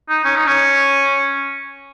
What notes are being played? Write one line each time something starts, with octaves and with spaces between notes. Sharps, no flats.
D#4
C#4
D#4
C#4